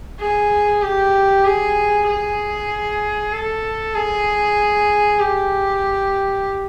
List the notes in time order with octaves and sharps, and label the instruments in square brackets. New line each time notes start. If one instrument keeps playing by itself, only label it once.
[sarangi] G#4
G4
G#4
G#4
A4
G#4
G4